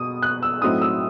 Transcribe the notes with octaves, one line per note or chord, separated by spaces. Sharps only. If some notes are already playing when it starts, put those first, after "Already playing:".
Already playing: B2 D#6
F#6
E6
A2 F#3 C4 D#4 D#6
E6